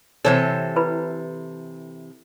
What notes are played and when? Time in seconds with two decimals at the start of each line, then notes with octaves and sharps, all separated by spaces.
0.25 C3 E3 A4 C5 C#5
0.76 E4 B4 B5